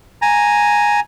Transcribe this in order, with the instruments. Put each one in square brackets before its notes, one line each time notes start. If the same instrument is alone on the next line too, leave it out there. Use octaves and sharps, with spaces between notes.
[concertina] G#5 A#5